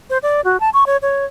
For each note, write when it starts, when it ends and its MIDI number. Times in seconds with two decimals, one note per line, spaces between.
0.10 0.18 72
0.23 0.41 74
0.45 0.60 66
0.60 0.70 81
0.74 0.84 85
0.87 0.97 73
1.02 1.25 73